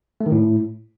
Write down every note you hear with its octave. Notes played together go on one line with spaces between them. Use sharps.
A3
D#3
A2